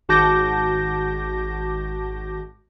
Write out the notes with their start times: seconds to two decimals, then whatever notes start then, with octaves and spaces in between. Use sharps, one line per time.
0.09 G#1 F#4 A5 D6 G6 A#6